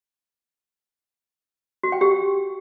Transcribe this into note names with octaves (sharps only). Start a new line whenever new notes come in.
F#4
G5
G4